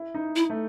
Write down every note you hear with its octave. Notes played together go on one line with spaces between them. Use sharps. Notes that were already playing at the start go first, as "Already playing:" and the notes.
Already playing: E4
D#4
E4
A3